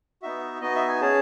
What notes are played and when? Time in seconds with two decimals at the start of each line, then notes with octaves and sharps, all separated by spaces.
0.22 B3 D#4 F#4 E5
0.61 B3 D#4 F#4 D#5
0.75 E5
0.88 G#5
1.01 C#4 G#4 A5